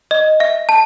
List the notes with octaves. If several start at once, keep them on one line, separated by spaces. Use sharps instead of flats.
D#5
E5
A5